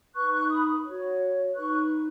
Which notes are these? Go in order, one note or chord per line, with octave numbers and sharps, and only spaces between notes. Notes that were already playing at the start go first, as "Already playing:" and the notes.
D#4 B4 C#6 F#6
C#6 F#6
B5 D#6
F#4 C#5
D#4 B4 C#6 F#6